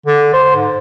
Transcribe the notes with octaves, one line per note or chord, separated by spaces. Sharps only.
D3
C5
G#2